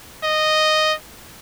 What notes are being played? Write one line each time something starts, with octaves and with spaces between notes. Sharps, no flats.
D#5